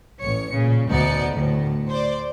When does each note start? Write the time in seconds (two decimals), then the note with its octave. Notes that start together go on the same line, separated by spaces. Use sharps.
0.22 A1 C#5 C#7
0.53 A#2 C#3
0.89 D2 B2 B3 D#4 D5 C#7
1.33 D2 A2
1.89 C5 D5